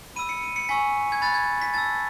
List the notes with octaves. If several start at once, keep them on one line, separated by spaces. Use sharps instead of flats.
B5 E6 D#7
C#7
D#7
C#7
G#5 C#6 E6 B6
G#6
B5 F#6 A6
G#6
B6
A5 E6 A6